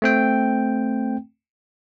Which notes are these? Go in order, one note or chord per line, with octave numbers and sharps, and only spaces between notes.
A3 C4 G5